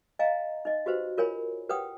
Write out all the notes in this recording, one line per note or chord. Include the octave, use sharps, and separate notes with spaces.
D#5 F5 G#5 A#5
D#4 D#5
F#4 G4 B4 C5
F4 A#4 C#5 G#5 B5
G4 B4 C#5 F#5 G5 D#6